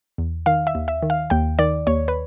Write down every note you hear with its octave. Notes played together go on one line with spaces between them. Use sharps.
E2
D#3 F5
E5
D#2
E5
D#3
F5
D#2 G5
D#3 D5
D#2 C#5
B4